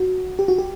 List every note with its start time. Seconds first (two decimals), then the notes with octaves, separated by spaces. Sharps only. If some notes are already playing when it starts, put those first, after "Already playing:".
Already playing: F#4
0.39 G4
0.48 F#4
0.58 G4